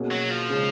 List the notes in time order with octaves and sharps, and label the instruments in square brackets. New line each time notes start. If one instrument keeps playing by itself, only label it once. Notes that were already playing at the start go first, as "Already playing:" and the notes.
Already playing: [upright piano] B2 A#3 C#4 G#4
[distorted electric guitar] F#3
F3
[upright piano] C#3 G#3 C#4